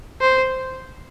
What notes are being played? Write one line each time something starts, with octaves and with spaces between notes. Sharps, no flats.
C5